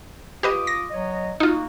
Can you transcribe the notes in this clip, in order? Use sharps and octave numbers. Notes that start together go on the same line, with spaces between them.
F4 G4 B4 D#5 D6 D#6
A#6
F#3 C#5 D#5
A#3 D#4 F4 F#4